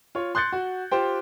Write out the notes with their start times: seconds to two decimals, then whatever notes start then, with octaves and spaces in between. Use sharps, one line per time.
0.15 F4 C#5
0.35 C6 F#6 G6 A6 C#7
0.52 F#4
0.91 F4 G4 C5 G5